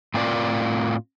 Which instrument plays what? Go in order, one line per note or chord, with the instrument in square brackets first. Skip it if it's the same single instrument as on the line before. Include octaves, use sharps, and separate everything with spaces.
[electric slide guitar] A2 C4 F4 A#4 D5